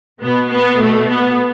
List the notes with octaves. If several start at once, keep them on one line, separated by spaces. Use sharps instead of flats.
B2 B3
B3
A3
B3